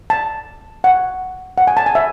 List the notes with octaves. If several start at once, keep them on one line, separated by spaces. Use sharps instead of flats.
A5
F#5
F#5
G#5
A5
G#5
E5